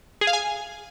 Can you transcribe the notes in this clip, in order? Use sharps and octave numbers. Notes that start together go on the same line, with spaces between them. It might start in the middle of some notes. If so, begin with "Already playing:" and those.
G#4
F5
G#5